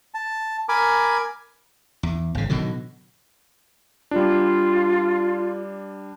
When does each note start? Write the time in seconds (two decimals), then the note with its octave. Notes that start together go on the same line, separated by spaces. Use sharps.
0.14 A5
0.69 A#4 G#5 B5 D6
2.03 E2
2.35 G#1 C#3
2.50 B2 D3 D#3 F#3
4.11 G3 D4 F4